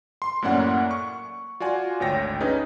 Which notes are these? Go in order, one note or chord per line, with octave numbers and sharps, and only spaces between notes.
C6
F#2 A2 A#3 C#4 D5 F#5
C#6
F4 F#4 D5 G#5
G#1 D2 C#5 G5 A#6
C#4 D#4 G#4 B4